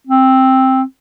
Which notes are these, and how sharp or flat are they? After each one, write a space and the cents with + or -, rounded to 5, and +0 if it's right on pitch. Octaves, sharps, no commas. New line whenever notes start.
C4 +5